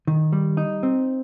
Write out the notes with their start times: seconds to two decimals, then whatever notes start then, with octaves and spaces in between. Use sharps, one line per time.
0.07 D#3
0.33 G3
0.57 D#4
0.83 C4